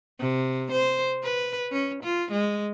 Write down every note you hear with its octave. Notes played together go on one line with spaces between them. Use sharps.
C3
C5
B4
C#4
F4
G#3